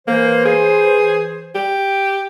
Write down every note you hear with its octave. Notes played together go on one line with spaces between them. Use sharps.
E3 A#3 C5
G#4
G4